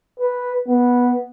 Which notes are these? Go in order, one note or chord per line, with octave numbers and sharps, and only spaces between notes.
B4
B3